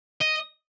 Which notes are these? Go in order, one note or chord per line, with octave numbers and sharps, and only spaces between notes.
D#5